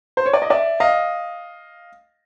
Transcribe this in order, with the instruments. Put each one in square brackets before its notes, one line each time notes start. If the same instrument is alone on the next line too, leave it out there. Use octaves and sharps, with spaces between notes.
[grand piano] C5
C#5
D5
D#5
D5 E5
D#5 F5